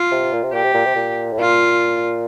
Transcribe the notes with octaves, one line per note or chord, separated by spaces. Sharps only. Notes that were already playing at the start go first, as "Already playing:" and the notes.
Already playing: F4
C3
A#2
C3
A#2 G4
C3
A#2
C3
A#2
A2
A#2 F4